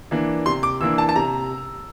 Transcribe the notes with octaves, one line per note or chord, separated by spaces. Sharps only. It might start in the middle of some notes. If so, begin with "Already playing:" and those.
E3 A#3 D4
C3 C6
D6
E3 A#3 D4 E6
A5
A5
C3 A#5